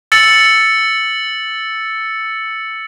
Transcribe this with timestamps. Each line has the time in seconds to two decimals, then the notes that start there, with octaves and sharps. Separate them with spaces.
0.12 E6 A6 C#7 F#7